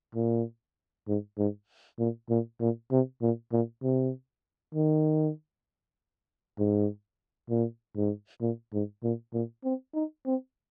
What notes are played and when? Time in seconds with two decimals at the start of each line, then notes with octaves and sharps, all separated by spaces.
0.15 A#2
1.07 G#2
1.38 G#2
1.99 A#2
2.30 A#2
2.60 A#2
2.91 C3
3.22 A#2
3.52 A#2
3.83 C3
4.75 D#3
6.59 G#2
7.50 A#2
7.96 G#2
8.41 A#2
8.73 G#2
9.04 A#2
9.33 A#2
9.64 C4
9.94 D#4
10.26 C4